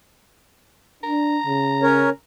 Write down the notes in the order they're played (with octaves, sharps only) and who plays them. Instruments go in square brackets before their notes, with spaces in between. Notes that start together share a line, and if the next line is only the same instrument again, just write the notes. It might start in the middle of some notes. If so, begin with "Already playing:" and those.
[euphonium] D4 [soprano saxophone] A#5
[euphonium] C#3
[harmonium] C#4 A#4 C#5